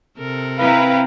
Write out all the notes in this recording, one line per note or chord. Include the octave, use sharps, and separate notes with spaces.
C3 A4 A#4
C4 E4 B4 F5 G5 A#5